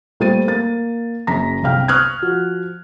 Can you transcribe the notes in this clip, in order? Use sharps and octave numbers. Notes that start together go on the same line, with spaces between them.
A#2 G3 A3 C5 A6 D#7
A#3 A6
F#1 F#2 A#5 A#6 B6
G1 C2 C3 F5 G5 F6
C#6 D#6 F6 F#6 G#6
F3 F#4